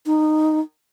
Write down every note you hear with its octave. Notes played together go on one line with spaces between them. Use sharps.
D#4